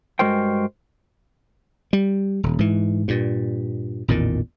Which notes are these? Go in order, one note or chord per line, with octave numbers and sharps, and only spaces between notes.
G2 G#3 F#4 A#4 C5 G5
G3
D#1
G#2 E3
G2 A#2
A1 E2 A#2 D#3